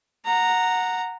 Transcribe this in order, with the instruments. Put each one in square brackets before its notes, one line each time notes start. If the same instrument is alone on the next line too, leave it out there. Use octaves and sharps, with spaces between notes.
[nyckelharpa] F#5 A#5